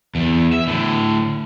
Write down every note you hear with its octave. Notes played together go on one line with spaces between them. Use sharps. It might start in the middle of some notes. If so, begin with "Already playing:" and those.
E2
E5
A2 D3